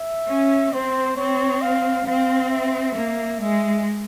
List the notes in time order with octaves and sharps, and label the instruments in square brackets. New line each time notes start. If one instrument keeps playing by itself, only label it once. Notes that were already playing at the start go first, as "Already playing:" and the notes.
Already playing: [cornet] E5
[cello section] C#4
[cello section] C4 [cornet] C5
[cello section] C4 [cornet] C#5
[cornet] F5
[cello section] C4 [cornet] F5
[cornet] E5
[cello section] A#3
[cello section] G#3 [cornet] E5